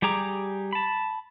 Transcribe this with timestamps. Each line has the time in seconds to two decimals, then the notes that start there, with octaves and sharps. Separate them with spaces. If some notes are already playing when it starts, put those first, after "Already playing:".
0.02 G3 G4 G#4 A#5 D6
0.73 A5 B5